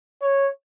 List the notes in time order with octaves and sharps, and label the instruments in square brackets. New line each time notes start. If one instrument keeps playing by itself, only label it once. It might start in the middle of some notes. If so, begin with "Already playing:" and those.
[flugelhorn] C#5